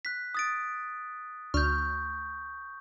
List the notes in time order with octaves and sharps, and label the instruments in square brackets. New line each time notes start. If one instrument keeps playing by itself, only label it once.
[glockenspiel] F#6 B6
D#6 A6 D7
[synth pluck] D2 F6 [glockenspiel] C#6 G6